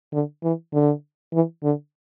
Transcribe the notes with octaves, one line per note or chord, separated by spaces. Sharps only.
D3
E3
D3
E3
D3